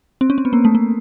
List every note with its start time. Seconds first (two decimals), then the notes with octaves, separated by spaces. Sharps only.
0.21 C4
0.30 C#4
0.38 C4
0.45 B3
0.53 A#3
0.65 A3
0.75 A#3